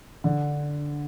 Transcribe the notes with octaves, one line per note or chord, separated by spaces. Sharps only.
D3